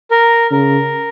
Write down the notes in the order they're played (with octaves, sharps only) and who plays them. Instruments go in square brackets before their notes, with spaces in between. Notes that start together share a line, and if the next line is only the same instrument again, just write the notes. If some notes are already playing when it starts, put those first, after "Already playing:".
[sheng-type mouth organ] A#4
[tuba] C#3 [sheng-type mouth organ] A#4